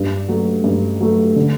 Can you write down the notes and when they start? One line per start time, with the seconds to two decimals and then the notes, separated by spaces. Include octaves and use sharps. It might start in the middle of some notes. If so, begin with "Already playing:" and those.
Already playing: G2
0.28 F#3 A3
0.64 G2
1.00 F#3 A3
1.36 D3